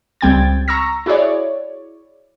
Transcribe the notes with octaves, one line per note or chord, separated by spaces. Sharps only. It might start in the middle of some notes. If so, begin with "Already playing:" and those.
C#2 G3 C4 G5 G#6 A6
A#5 C#6 E6 A#6
E4 F#4 G#4 C#5 D5